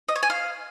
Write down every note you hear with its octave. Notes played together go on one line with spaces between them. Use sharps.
D#5
C#5
G#5
F5